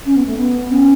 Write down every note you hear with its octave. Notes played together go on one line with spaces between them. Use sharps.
C#4
B3
A3
B3
C#4